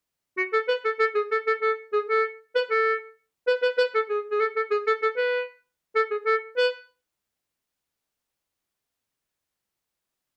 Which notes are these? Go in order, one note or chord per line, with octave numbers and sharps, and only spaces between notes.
F#4
A4
B4
A4
A4
G#4
A4
A4
A4
G#4
A4
B4
A4
B4
B4
B4
A4
G#4
G#4
A4
A4
G#4
A4
A4
B4
A4
G#4
A4
B4